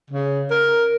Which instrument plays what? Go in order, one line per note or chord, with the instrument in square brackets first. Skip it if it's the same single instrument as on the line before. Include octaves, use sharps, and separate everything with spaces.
[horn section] C#3
A#4